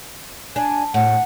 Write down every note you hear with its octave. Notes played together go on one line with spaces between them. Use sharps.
D4 G#5
A2 F#5